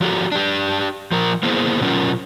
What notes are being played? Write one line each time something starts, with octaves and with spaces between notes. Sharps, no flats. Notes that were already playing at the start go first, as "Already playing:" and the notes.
F3 F#4 G4 A4
D4 G4
F3 A#4
A#3 B3 E4 G#4 C5
B2 F#3 C#4 F4 A#4